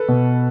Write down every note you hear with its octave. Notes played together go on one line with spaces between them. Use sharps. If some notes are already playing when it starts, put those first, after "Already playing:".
Already playing: A4 B4
B2